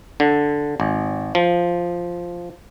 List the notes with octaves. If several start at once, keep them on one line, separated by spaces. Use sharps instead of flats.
D3
G#1
F3